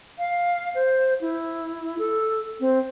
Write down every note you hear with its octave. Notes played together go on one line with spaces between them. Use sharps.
F5
C5
E4
A4
C4